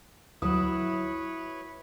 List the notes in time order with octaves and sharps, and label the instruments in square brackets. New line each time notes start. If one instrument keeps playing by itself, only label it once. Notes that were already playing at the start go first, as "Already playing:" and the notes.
[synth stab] D2 F#3 [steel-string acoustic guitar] E4 F#4 [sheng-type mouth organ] B4 C#5 [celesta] D#6